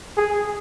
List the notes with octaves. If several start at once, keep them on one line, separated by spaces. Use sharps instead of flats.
G#4